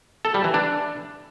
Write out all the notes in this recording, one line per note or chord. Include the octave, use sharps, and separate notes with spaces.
A4
G3
E3
D4